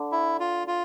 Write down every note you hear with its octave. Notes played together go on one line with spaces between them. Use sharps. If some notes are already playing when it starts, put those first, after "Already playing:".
Already playing: D3
E4
F4
F4